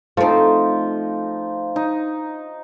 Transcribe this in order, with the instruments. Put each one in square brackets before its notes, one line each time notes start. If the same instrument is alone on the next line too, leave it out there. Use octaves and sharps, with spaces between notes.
[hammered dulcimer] F3 D#4 [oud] A3 C4
[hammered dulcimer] D#4